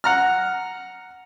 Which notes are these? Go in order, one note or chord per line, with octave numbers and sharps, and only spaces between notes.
F#5 A#5 F6